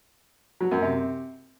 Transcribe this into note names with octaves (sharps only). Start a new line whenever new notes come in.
F#3
F#2
C3